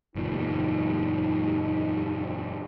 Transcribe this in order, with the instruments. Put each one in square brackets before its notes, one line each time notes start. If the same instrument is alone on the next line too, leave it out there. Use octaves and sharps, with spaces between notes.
[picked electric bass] F#1 E2 A#2 [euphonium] D#4